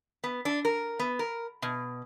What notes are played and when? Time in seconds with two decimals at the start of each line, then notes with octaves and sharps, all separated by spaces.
0.24 B3
0.45 D4
0.65 A#4
0.99 B3
1.19 A#4
1.62 B2